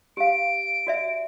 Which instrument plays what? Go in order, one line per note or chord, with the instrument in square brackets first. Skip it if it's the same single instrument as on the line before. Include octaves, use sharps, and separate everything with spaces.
[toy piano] G4 F5 [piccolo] D7
[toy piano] F#4 D5 E5